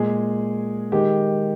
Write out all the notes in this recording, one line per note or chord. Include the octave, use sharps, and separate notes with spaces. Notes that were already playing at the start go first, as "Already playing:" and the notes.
Already playing: A#2 G#3 G#4
D#3 G#3 G4